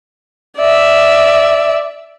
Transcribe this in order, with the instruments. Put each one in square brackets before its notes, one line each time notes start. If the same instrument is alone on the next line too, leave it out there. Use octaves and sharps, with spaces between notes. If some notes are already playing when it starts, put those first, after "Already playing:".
[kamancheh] D5 E5